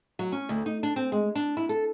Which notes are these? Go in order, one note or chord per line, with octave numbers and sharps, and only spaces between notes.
F#3
C#4
D2
D#4
D4
C4
G#3
D4
E4
A4